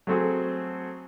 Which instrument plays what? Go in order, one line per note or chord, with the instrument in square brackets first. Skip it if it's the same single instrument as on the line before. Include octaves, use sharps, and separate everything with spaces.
[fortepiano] F#3 A3 C4 F#4 G#4